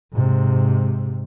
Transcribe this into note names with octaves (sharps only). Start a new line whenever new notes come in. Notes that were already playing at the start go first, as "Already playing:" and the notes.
G#2 C3